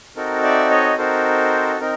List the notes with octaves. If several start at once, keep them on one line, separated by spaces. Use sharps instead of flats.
C4 D#4 F#4 A4 A#4
D5 E5
C#5 D#5
C4 D#4 F#4 A4 A#4 C5
C4 D#4 A#4